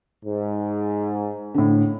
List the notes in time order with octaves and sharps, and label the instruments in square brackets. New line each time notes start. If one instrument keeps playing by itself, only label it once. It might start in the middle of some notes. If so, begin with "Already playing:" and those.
[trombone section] G#2
[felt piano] A2 D3